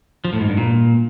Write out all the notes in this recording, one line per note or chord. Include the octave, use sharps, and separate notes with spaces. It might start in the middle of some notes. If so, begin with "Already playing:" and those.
F3
A2
G#2
G2
A#2